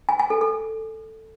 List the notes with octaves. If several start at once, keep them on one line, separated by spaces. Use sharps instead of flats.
G#5
G#5
A4
A4